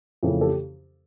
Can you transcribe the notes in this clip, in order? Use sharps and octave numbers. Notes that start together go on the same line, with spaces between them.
F2 C#3 E3 A3
G4 A4